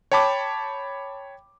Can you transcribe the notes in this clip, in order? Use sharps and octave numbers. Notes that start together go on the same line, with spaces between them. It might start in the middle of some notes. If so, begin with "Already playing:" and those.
C#5 G5 A5 B5 D6